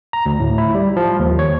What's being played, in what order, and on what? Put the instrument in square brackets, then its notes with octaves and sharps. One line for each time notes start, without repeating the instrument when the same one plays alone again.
[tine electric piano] A#5
D2
A2
E4
G3
F3
D#2
C#5